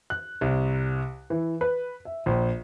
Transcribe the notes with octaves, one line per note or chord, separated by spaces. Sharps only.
F#6
C2
E3
B4
E5
A#1